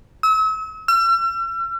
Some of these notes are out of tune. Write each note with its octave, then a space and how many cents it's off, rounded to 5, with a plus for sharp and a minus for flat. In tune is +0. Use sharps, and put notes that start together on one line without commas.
E6 -40
E6 +45